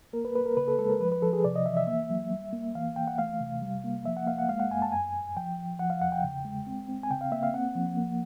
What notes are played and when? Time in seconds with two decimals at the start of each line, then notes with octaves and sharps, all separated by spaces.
0.13 A#3 A#4
0.25 B4
0.35 A#3 B4
0.46 A#4
0.57 C#3 B4
0.68 A4
0.79 G#3 A4
0.90 A#4
1.00 F3 B4
1.12 B4
1.22 F3 A4
1.33 G#4
1.44 C3 D5
1.56 D#5
1.66 E3 E5
1.77 E5
1.87 A#3 E5
2.10 F#3
2.31 G3
2.53 A#3
2.75 E3 F5
2.96 E3 G5
3.08 F#5
3.18 A3 F5
3.40 C3
3.62 G3
3.84 A#3
4.05 F3 E5
4.17 F#5
4.27 A#3 F5
4.39 F#5
4.49 G#3 F5
4.60 F#5
4.70 F#2 G#5
4.82 A5
4.92 F#2 G#5
5.14 F#2
5.37 F3 G5
5.58 F3
5.79 F3 F#5
5.90 F5
6.01 E2 F#5
6.12 G5
6.24 C#3
6.45 G#3
6.67 C4
6.89 C4
7.03 G#5
7.10 C#3 G5
7.21 F5
7.32 A#3 E5
7.43 F5
7.53 C4 F#5
7.75 F3
7.97 A#3